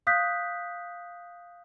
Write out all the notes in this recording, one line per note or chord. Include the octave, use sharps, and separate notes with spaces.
F5 D#6 F#6 G6 B6